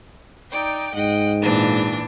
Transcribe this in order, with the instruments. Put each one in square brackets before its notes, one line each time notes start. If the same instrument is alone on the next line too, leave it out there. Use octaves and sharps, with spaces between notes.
[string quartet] D#4 D5 G5
[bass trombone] G#2 [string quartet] D#5 F#5 G5
[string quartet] A#2 E3 D4